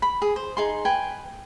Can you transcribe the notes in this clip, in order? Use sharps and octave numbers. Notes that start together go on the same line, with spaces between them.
B5
G#4
C5
D#4 G#4 C6
B4 G5 G#5